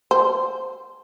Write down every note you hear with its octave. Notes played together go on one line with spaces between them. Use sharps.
C5